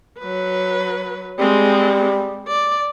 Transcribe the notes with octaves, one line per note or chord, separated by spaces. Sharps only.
F#3 B4
G3 G#3 C4
D5